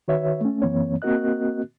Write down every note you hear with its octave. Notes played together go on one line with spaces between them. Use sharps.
D#3 F#4 B4 C#5 E5
A3 C#4
F#2 E3 A#3 C4 C#5
A#3 C4 F#4 A#4 D#5 F#6